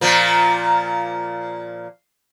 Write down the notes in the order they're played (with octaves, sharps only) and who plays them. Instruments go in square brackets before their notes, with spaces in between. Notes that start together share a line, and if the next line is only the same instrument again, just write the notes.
[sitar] A#2 F3 A#3